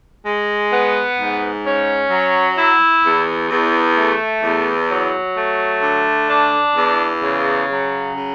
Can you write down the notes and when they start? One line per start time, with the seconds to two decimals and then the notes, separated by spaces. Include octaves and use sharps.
0.24 G#3
0.71 B3
1.18 G#2
1.64 C#4
2.10 F#3
2.57 E4
3.03 E2
3.49 E2
3.96 A3
4.43 E2
4.89 F#3
5.37 A3
5.82 D3
6.29 D4
6.76 E2
7.22 C#3
7.69 F#3
8.15 C#3